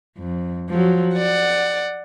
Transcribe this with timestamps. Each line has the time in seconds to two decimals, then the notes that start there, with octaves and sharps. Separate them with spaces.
0.18 F2
0.70 F3 F#3
1.16 D5 F#5